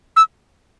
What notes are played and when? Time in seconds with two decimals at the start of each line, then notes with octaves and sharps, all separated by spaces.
0.16 E6